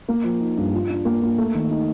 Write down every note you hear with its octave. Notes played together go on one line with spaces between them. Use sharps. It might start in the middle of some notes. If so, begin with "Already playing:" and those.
A#3
F3
D#4
G2
F4
D4
A#3
A#3
A3
D#3
D#4